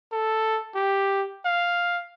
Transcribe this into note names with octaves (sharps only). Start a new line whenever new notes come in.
A4
G4
F5